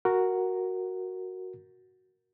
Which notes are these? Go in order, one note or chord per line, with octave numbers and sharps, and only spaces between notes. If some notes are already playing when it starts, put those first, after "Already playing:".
F#4 A#4